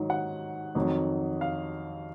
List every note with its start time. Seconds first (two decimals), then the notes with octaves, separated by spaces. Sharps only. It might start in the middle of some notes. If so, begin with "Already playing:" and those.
Already playing: G#2 D#3 F#3
0.10 F#5
0.75 F2 D#3 F#3
1.41 F5